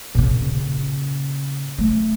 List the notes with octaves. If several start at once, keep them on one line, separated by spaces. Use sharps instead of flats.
A#2 C#3
A3